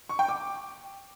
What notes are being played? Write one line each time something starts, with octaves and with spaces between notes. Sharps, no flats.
C#6
G5
D6